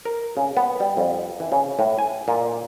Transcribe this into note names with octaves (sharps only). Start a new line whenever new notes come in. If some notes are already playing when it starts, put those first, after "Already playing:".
A#4
C#3
B3
G3
F2
E3
C#3
A2
G#5
A#2